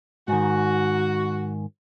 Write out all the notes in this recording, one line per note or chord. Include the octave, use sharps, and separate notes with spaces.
G#2 D#3 F#4